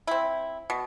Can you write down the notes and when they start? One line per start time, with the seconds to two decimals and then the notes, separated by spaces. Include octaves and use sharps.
0.07 C4 E4
0.70 B2